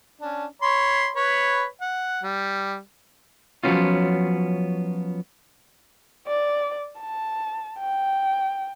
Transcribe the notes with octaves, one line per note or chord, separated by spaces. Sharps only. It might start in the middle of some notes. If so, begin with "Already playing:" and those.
C#4 D4
C#5 B5 C6
B4 C#5 B5
F#5
G3
F3 F#3 G#3 B3 C#4 F4
D5
A5
G5